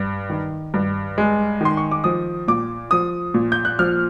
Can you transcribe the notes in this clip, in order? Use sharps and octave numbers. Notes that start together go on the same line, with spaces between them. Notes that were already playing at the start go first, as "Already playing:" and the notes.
Already playing: G2
D#3
G2
G#3
D#3 C6
C#6
D6
F3 D#6
A#2 D6
F3 D#6
A#2
G6
F#6
F3 F6